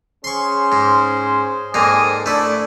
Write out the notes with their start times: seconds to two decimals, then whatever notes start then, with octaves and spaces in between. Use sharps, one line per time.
0.24 C#4 G#4 C5 C6 C#6
0.72 G#2
1.74 F2 G#2 A#3 D5 G#5 D#6
2.26 A3 D4 E4 D5